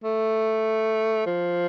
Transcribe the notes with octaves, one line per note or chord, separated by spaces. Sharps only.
A3
F3